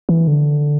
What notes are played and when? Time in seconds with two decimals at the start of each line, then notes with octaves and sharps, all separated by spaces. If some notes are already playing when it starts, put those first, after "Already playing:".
0.09 E3
0.27 D3